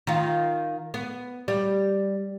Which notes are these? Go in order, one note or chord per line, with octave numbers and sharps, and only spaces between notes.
D#3 F4
B3
G3